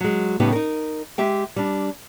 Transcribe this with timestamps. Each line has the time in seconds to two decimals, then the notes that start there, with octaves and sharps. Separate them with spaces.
0.01 F#3 G#3
0.40 A2 C#3 G3 B3 D#4 G4
0.52 D#4 A#4
1.18 G#3 G4 E5 G5
1.56 G3 D4